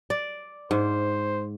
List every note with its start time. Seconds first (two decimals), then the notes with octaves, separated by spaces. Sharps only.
0.10 D5
0.71 G#2 C5